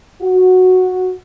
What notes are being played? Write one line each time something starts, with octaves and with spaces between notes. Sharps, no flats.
F#4